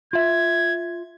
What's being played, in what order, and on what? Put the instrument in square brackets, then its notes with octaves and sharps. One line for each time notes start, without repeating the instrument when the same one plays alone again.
[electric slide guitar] F4 E5 [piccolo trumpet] G#6